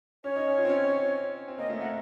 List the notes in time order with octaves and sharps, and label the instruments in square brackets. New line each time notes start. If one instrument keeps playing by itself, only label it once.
[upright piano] C#4 [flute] C#5
[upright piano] D#4
C#4
F4
C4
C#4
C4
[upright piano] A#3 [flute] D#5
[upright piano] A3
[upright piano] A#3 [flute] F#5